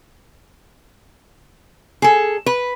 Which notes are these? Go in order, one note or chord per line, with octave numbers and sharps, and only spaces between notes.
G#4 A4
B4